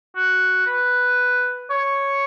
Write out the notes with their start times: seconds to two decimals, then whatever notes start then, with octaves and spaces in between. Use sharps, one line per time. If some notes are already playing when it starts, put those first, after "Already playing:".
0.16 F#4
0.67 B4
1.70 C#5